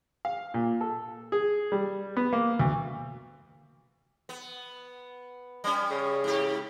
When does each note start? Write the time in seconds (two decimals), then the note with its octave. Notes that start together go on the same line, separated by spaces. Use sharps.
0.25 F5
0.54 A#2
0.81 A4
1.32 G#4
1.72 G3
2.17 B3
2.33 A#3
2.59 D2
4.29 B3
5.64 G3 C#4
5.91 C#3
6.24 G#2 G4